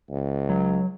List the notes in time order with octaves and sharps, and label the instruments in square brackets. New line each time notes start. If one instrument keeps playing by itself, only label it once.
[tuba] C#2
[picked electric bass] F#3